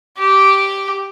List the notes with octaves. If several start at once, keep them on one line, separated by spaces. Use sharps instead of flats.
G4